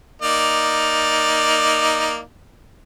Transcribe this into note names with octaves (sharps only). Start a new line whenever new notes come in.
A#3 D#4 D5